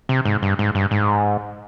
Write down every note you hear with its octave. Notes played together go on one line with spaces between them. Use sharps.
C3
G#2
G2
G#2
G2
G#2